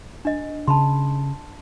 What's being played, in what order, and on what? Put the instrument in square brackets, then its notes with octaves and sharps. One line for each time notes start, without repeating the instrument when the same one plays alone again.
[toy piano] D4 D#5
[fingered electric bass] C#3 [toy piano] A5 B5 C6